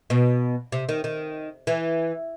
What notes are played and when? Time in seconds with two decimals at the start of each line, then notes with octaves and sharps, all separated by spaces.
0.10 B2
0.72 C3
0.89 D#3
1.04 D#3
1.67 E3